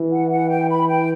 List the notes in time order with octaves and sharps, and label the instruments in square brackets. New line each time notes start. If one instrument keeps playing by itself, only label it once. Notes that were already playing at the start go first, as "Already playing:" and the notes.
Already playing: [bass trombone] E3
[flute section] F#5
F#5
G5
B5
G5